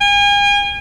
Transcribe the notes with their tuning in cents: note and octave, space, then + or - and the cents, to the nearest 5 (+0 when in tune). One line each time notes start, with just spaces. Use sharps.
G#5 -40